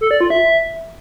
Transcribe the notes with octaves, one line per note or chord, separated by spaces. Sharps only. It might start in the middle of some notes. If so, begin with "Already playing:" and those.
A4
D5
F4
E5